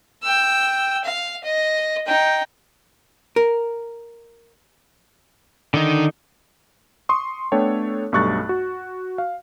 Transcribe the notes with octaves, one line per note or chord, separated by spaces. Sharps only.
G5 E6
F5
D#5
D#4 G5
A#4
D3 D#3 D#4
C6 C#6 D#6
A3 B3 D4 A4 C#5 G5
B1 G2 A3 C#6 F#6 A6
F#4
F5